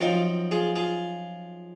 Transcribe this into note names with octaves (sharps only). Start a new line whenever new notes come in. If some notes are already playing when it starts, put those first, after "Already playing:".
F#2 F3 C4 D#4 F4
F4 G#4
F4 G#4